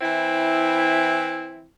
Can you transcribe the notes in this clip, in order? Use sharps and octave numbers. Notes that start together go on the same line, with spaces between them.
E3 C4 E4